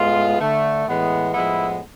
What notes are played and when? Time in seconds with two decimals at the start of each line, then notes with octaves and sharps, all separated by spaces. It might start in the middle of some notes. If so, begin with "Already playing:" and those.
Already playing: A2 G#3 B3 F4
0.40 D3 A3
0.87 A2 E3 G#3 B3
1.34 A2 F3 G#3 B3 E4